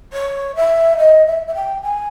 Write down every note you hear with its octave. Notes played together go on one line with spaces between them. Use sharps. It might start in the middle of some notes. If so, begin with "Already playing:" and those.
C#5
E5
D#5
E5
E5
G5
G#5